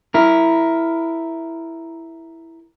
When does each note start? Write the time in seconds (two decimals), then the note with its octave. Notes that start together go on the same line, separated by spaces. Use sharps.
0.14 E4 A#4